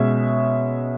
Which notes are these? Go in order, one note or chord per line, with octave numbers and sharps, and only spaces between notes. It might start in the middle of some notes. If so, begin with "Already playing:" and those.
Already playing: B2 G#3 C#4 E5